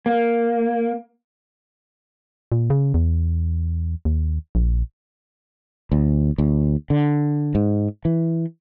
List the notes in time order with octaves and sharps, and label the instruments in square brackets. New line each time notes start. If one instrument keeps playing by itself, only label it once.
[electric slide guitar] A#3
[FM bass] A#2
C#3
E2
D#2
A#1
[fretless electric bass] D2
D2
D3
G#2
E3